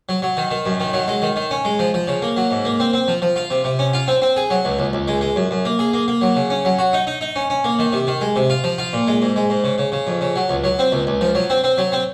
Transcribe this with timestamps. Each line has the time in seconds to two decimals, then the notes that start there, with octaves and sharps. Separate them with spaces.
0.09 F#3
0.22 F#3
0.37 D#3
0.51 D#3
0.66 F#2
0.80 D#3
0.93 F#3
1.08 G#3
1.22 D#3
1.36 D#3
1.51 C#4
1.65 G#3
1.79 F3
1.94 F3
2.08 C#3
2.22 A#3
2.37 F#3
2.51 G#2
2.65 A#3
2.80 C4
2.93 C4
3.08 F3
3.22 F3
3.36 F4
3.50 C3
3.64 C3
3.79 C#4
3.93 F4
4.08 C4
4.22 C4
4.37 G#4
4.50 F#3
4.65 C#2
4.79 C#2
4.93 C#2
5.08 G#3
5.21 G#3
5.36 F#2
5.51 F#2
5.65 A#3
5.79 G#4
5.93 A#3
6.08 A#3
6.21 F#3
6.35 C#3
6.50 C#4
6.65 F#3
6.79 F#4
6.93 D#4
7.07 D#4
7.21 D#4
7.36 C#4
7.50 C#4
7.64 A#3
7.79 D#3
7.92 C3
8.07 D#3
8.21 G#3
8.36 C3
8.50 F4
8.64 F3
8.78 F4
8.93 A#2
9.07 G#3
9.22 G#2
9.36 G#3
9.50 G#2
9.64 C#3
9.78 C#3
9.92 C#3
10.07 F2
10.21 C#3
10.36 F#3
10.49 C#2
10.64 F#3
10.79 C4
10.92 C#2
11.07 C#2
11.21 F3
11.35 F#3
11.50 C4
11.64 C4
11.78 F#3
11.92 C4